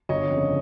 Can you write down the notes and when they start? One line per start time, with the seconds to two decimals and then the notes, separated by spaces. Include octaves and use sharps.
0.09 G1 C#5 D#5
0.30 F2 C#3